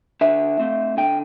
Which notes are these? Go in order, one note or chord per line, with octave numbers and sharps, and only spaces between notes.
D3 E5
A3 C4
D3 G5